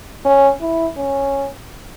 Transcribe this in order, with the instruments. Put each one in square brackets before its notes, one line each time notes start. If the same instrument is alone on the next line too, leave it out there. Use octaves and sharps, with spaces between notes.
[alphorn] C#4
E4
C#4